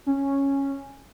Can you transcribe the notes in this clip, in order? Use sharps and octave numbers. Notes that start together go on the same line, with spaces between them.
C#4